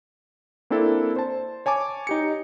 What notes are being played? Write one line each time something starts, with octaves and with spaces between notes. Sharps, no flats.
A#3 C4 D4 E4 A4
C5 A5
C#5 G#5 A5 D6
D#4 G4 C#7